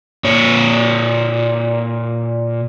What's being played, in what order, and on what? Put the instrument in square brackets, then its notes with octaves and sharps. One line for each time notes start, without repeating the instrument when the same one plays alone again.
[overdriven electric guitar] A#2 C#5